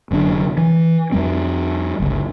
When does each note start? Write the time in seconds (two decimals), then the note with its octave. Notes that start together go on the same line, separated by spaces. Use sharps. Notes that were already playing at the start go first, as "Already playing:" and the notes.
0.11 F1 F#2 D3 D4
0.57 E3
1.12 F2 G3 C4
2.00 G1 C#2